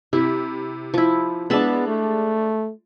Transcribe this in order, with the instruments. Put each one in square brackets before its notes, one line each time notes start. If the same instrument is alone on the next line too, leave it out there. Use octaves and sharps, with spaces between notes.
[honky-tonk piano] C3 [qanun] E4
[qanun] F3 E4
[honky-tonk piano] G#3 D4 [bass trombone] B3 [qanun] E5 A5 B5
[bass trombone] A3